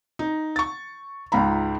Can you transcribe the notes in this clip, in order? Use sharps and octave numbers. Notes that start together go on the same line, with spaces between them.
D#4
C#6 A6
C#2 G#2 F4 A#5 B5